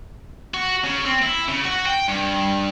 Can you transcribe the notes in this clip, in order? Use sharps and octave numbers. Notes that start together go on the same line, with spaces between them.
F#4
C#3
C4
E4
C#3
F#4
G5
G2